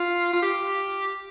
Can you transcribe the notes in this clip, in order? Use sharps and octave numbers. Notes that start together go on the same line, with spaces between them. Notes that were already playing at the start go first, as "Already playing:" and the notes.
Already playing: F4
F4
G4